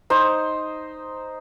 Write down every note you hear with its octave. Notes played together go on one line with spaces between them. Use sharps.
D#4 C5